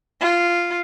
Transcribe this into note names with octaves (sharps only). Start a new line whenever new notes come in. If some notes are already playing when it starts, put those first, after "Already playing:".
F4